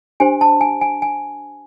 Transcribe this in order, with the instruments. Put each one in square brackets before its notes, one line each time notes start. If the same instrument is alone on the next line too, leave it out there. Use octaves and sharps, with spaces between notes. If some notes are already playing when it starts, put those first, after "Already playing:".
[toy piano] D4 G4 C5 G#5
A5
G#5
G#5
G#5